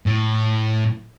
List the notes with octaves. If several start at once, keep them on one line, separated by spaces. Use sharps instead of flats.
A2